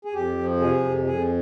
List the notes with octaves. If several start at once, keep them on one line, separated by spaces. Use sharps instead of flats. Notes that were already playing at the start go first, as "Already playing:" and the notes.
G#4
F2 G4
F3
C3 G#4
F2
F2 G#4